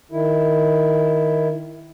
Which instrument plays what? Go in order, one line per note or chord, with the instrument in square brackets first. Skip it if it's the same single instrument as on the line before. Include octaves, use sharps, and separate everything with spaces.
[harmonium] D#3 E4